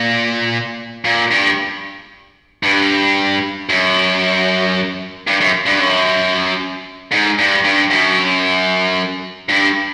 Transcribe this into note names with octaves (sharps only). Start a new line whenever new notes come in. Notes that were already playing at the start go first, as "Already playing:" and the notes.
Already playing: A#2
A#2
G2
G2
F#2
G2
F#2
G2
F#2
G#2
G2
G2
F#2
G2